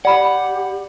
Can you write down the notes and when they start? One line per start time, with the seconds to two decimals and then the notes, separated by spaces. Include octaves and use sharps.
0.05 G4 D5 F#5 B5